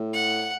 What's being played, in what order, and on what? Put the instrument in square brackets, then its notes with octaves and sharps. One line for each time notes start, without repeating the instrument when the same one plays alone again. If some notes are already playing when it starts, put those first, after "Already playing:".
Already playing: [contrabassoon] A2
[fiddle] F#5